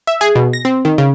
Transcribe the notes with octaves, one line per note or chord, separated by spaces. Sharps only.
E5
G#4
B2
A#6
C4
D#3
C#3